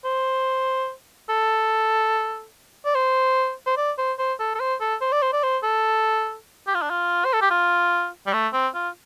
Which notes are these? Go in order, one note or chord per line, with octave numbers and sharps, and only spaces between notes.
C5
A4
D5
C5
C5
D5
C5
C5
A4
A4
C5
A4
C5
D5
C5
D5
C5
A4
G4
F4
D4
F4
C5
A4
G4
F4
G3
A3
C4
F4